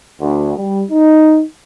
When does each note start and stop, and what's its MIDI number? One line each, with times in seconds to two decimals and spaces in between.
0.21 0.53 38
0.57 0.84 55
0.91 1.43 63